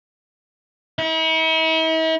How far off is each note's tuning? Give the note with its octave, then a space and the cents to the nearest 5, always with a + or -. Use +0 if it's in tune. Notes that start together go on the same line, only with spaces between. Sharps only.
E4 -45